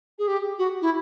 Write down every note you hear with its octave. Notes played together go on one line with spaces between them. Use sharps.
G#4
G4
F#4
E4